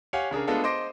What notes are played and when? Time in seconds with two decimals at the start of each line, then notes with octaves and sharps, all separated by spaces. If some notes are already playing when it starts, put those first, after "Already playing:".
0.13 G4 C#5 F5 F#5 G#5
0.31 C#3 D4 G#4 A#4
0.47 G#3 A3 B3 D4 F4 A4
0.64 C5 D#5 C6 D6 A#6 D7